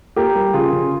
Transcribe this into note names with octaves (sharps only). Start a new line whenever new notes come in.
A#3 G4 A#4
G3
C#3 F4 G#4
C#3